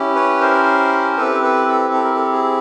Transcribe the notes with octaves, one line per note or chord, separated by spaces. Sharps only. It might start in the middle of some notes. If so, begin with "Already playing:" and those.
Already playing: C#4 E4 G4
B4 C#5
A#4 C5
C4 E4 G4 A4 B4
A4 B4
A4
A4
A#4
A4
G#4